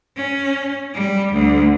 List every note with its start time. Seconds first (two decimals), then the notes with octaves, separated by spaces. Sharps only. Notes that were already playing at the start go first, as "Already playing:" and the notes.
0.16 C#4
0.94 G3
1.33 D2